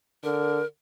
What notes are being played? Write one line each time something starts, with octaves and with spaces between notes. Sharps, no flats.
D3 A#4